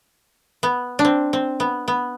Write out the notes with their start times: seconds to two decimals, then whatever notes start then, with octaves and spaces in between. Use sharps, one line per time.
0.63 B3
0.99 D4
1.05 C4
1.33 C4
1.60 B3
1.88 B3